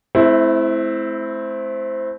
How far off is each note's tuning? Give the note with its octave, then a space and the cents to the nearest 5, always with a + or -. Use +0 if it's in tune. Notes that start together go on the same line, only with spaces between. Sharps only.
A3 -35 C4 +0 E4 +0